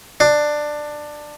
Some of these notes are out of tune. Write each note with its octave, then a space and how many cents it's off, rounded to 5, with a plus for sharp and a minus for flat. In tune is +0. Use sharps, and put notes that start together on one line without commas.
D4 +15